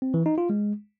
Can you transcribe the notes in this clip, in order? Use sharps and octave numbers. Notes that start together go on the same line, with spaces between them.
C4
E3
D#4
F4
G#3